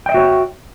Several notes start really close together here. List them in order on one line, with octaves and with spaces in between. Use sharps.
G5 D#5 E5 F#4 C#5